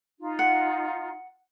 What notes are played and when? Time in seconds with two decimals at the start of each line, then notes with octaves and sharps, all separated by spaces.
0.19 D#4 F4
0.39 F#5